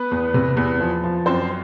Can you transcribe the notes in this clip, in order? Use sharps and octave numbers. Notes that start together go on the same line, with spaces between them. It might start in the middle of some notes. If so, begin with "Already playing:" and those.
Already playing: B3 B4
E2
C3
E2
F3
F3
F#2 C4 C5